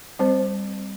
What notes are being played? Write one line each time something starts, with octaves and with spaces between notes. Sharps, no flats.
G3 C4 C5